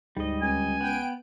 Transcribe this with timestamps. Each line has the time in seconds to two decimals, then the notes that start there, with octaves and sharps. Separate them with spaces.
0.17 D2 G#2 G3 D#5
0.42 C#2 G#5
0.81 B3 G5 D7